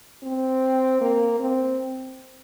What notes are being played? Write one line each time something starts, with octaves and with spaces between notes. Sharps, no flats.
C4
A#3
C4